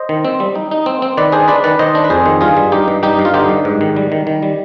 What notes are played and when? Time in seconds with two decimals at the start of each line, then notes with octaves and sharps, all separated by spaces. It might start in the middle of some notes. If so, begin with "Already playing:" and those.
Already playing: C5 D#5
0.09 D#3
0.25 C4
0.40 G3
0.55 D#4
0.71 D#4
0.86 C4
1.02 C4
1.17 D#3 B4 D5
1.32 D4 G#4 C5
1.48 D4 B4 D5
1.64 D#3 B4 D5
1.79 D#3 C5 D#5
1.95 D4
2.04 B4
2.10 F2 G#4 C5
2.26 D#3
2.41 G2 F4 G#4
2.57 G3
2.72 G2 D#4 G4
2.88 G2
3.03 G3 D#4 G4
3.19 G2
3.25 F4
3.34 D3 D#4 G4
3.49 G2
3.65 G#2
3.81 D#3
3.96 G3
4.12 D#3
4.27 D#3
4.42 G3